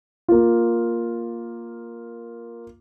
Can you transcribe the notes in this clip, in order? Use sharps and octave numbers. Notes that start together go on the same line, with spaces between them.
A#3 F4